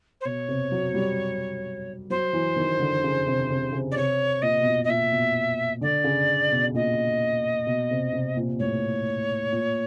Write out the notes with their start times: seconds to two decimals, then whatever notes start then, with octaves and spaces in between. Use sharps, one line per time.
0.21 C5
0.25 B2 C#5
0.48 C3
0.72 F#3
0.94 G3
2.10 F#3 C5
2.33 E3
2.56 D#3
2.80 D3
3.04 C#3
3.26 C3
3.50 C3
3.72 C#3
3.91 D5
3.96 C3 C#5
4.42 A#2 D#5
4.61 B2
4.66 A#2
4.84 D#5
4.88 A#2 E5
5.12 B2
5.81 D3 D5
6.04 C#3
6.52 B2
6.74 A#2 D#5
7.66 B2
7.91 C3
8.13 C3
8.37 A#2
8.59 A2 C#5
9.52 A#2